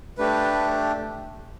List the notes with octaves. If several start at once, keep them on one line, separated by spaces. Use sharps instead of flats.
A3 D4 G4 B4